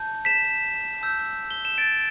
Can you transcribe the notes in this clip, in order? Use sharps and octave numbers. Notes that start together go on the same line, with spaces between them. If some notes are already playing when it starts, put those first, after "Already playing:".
Already playing: A5 G6
B6 E7
A5 E6 G6
G7
E7
A6 D7